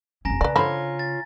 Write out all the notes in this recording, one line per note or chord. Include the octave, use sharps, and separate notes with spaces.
F1 C#4 G#5 A#5 A#6
C#3 B4 D5
D3 F4 C5 C#5 B5
A6